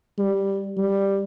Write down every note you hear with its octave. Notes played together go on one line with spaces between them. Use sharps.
G3
G3